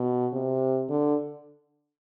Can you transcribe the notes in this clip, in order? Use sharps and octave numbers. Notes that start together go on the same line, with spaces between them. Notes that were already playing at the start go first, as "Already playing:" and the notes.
Already playing: B2
C3
D3